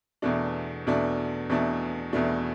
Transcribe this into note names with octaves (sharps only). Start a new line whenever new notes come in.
E2 B2 A3 D4
E2 B2 A3 D4
E2 B2 A3 D4
E2 B2 A3 D4